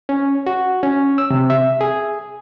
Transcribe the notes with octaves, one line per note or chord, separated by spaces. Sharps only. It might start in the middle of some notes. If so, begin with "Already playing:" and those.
C#4
F#4
C#4
E6
C3
E5
G#4